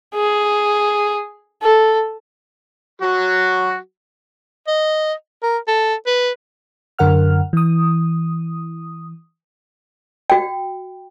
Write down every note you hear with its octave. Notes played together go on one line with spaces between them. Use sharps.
G#4
A4
F#3 F#4
D#5
A#4
A4
B4
F#2 D3 A#4 F#5 F6
E3 D#6
F#4 G5